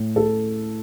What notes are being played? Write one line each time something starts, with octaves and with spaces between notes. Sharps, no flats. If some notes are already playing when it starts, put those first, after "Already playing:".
Already playing: A2
A4